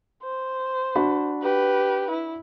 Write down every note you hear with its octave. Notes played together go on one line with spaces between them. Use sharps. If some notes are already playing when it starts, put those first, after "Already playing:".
C5
D4 F#4 B5
G4 B4
E4